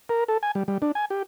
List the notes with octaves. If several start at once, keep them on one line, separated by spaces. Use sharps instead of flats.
A#4
A4
G#5
G3
G3
D4
G#5
G4